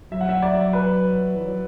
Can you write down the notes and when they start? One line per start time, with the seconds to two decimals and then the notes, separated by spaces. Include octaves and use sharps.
0.11 F#3 E5
0.21 F#5
0.28 F#3 E5
0.42 F#3 D5
0.58 F#3
0.73 B4
1.35 E3
1.46 F#3